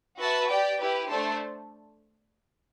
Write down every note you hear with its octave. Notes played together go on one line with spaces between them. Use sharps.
F#4 B4 E5 A5
G4 D5 G5
E4 G4 B4
A3 D4 A4 C5